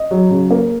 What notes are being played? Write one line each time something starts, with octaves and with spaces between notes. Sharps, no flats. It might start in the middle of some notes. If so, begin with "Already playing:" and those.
Already playing: D#5
F#3
C#3
A#3